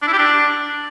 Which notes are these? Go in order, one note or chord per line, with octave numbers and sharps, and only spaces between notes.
D4
E4
G4
D4